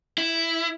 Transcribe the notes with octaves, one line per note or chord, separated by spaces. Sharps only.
E4